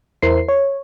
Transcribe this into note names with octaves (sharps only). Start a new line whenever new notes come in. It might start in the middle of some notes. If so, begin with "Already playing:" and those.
E2 E4 A#4 C5 C7
C#5